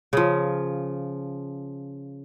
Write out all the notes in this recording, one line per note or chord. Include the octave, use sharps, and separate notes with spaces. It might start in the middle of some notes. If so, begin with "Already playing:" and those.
C#3 F3